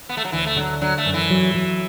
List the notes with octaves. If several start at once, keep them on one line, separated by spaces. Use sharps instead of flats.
B3
A3
F#3
D2 E3
A3
D3 F#3
F#3 D4
A3
F#2
E3
F#3
F#3